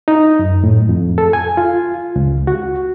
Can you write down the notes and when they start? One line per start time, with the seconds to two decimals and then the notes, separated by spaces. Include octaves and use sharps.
0.08 D#4
0.39 F#2
0.64 A2
0.89 F2
1.18 A4
1.33 G#5
1.57 F4
2.16 C#2
2.47 F#4